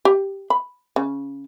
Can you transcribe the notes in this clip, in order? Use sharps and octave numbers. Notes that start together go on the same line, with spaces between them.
G4
B5
C#3